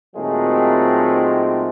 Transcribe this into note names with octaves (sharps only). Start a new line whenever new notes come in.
A#2 D#3 F#3 G#3 A3 C4